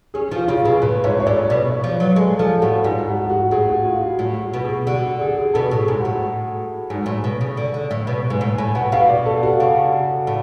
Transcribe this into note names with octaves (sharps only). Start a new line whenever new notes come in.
C#4 G#4
F3 F4
C#3 F4
B2 G#4
A2 B4
G#2 C#5
C#5
A2 D5
B2 D5
C#5
F3
B4
F#3
G#3 A4
F3 A4
A2 F#4
G#2 F4
F#4
F#4
A2 G#4
F#4
F4
F#4
A2 F4
F#4
B2
G#4
D3 F#4
G#4
G#4
B2 A4
A2
G#4
G#2
F#4
A2
G#2
A2
B2
C#3
D3
D3
A2
B2
B4
G#2
A2
A2 G#5
B2 F#5
B2 F5
D5
A4
F#4
C#3
A2